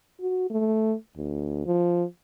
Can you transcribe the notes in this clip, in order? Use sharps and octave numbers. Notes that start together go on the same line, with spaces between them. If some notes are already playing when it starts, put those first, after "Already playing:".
F#4
A3
D2
F3